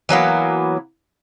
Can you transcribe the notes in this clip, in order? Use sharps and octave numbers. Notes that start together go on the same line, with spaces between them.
E3 F#3 A#3 B3